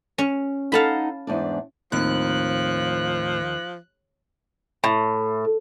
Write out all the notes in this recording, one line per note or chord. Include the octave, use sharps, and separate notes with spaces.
C#4
D#4 A4 F5 F#5 A5 B5
E2 G#2 D4
D#2 A2 F3 C4 F#6
A2